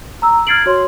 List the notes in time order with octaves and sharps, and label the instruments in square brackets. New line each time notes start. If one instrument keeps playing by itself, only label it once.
[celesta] A#5 E6
F6 G#6 A6 C7 D7 F#7
F#4 C#5 C6